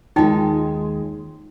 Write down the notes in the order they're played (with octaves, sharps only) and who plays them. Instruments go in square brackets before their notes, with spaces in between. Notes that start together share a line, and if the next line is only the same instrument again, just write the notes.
[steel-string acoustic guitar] D#2 G#3 [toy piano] D#4 F4 G5